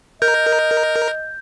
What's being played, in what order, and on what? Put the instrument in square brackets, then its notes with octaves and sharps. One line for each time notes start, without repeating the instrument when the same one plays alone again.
[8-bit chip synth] A#4 [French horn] D#5 [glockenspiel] G6